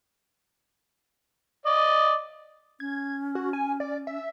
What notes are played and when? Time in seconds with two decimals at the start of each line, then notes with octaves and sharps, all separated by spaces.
1.66 D5 D#5
2.80 C#4 G#6
3.35 F#4
3.53 G#5
3.80 D5
4.07 E5